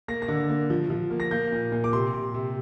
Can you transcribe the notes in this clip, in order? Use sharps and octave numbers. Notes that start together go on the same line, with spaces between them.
A#3 A#6
A#6
D3
A#3
F3
F3
A#3
A#6
A#3 G6
A#2
A#2
D6
C3 C6
C3
C3